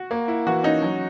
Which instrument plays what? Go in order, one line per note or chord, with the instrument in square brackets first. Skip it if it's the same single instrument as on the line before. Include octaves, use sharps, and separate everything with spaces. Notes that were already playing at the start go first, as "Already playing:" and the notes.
Already playing: [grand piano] F#4
[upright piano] A#3
E4
[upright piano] E3 [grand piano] F#4
[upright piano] C#4 [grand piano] D#4
[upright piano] F#3